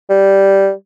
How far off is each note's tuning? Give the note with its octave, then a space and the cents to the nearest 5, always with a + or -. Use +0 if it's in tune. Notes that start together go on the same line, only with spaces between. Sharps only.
G3 -5